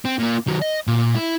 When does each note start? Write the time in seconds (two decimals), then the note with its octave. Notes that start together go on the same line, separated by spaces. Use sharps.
0.06 C4
0.19 A#2 A#3
0.47 D#3 F#3
0.62 D#5
0.87 A#2
1.15 E4